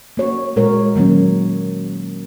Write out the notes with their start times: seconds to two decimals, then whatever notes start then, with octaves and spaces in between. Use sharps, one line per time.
0.17 A#3 F#4 C#5
0.56 A#2 G#3 F#4 A#4 C#5
0.96 D#3 F#3 A#3 C#4